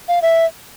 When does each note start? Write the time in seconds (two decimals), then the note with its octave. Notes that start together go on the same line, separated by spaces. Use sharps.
0.08 F5
0.22 E5